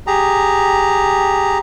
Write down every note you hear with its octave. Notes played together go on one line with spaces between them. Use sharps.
G4 G#4 A#5